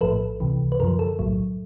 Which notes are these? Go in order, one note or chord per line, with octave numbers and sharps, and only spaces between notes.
A#1 A2 F3 A4 B4
C#2 C3 E3
B4
F#2 D3 F3 A#4
A4
B1 A2 F#3